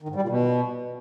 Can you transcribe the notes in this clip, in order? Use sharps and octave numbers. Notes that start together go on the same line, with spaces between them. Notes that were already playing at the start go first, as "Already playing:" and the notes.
D#3
G#2
G3
A#2
B2